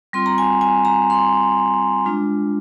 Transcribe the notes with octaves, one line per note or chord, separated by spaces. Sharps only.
G3 C4 F4 C6
A#5
G#5
G#5
A#5
C6
G#3 D4 F4